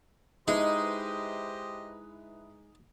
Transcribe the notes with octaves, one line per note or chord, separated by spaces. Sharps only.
G#3 D#4 E4 G4 B4 C5 D#5